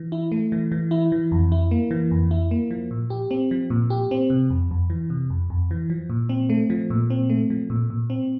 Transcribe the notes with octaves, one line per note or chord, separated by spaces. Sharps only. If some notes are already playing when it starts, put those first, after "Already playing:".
Already playing: E3
E4
A3
E3
E3
E4
E3
F2
E4
A#3
E3
F2
E4
A#3
F3
A#2
G4
C4
F3
A#2
G4
C4
C3
F2
F2
E3
C3
F2
F2
E3
F3
A#2
C4
A3
F3
A#2
C4
A3
F3
A#2
A#2
C4